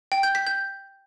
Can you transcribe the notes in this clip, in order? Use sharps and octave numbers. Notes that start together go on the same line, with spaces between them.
G5
G6
B6
G6